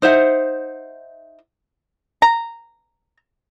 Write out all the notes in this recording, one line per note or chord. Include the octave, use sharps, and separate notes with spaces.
D#4 C5 E5 F#5
A#5